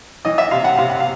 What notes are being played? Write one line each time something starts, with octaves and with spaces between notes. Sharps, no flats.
E3 D#5
E5
C3 F5
F#5
C3 F5
F#5
F5